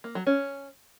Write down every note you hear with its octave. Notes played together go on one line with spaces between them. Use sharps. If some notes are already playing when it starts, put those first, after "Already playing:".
A#3
F#3
C#4